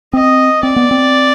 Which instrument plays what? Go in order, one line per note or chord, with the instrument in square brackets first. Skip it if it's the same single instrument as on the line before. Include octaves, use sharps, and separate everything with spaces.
[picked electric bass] C4 [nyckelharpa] D#5
[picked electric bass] C4 [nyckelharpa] D5
[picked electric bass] B3
C4